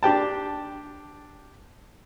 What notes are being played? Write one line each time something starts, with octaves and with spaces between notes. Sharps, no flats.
D4 G4 G5 A5